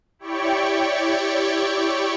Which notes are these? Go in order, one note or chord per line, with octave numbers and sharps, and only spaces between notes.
E4 G4 C#5 D5 G5 C#6